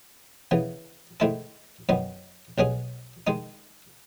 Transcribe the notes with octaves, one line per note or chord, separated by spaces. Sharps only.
C#3 E3 B3
G#2 D#3 A3 E4 A4
F#2 D#3 F#3 B3
B1 B2 F#3 C#4 G#4
D#3 G#3 D#4